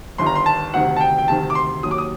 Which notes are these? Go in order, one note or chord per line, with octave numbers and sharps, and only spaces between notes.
G1 G2 D#3 C6
A#5
C6
A5
D2 C3 D#3 F#5
A5
G5
G5
D2 C3 D#3 A5
D6
C6
D#2 D#3 F#3 D#6
D6
D#6